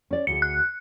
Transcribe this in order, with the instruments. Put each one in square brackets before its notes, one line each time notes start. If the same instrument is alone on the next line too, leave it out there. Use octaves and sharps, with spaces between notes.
[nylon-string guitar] C#4 D5
[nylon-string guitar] D2 G#4 [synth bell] C#7
[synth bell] F#6